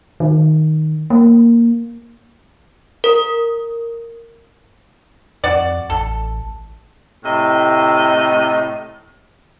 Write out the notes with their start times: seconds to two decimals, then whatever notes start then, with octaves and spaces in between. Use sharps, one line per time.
0.20 D#3
1.10 A#3
3.04 A#4
5.44 F2 F#4 D5
5.90 A1 A4
7.23 A2 C3 D#5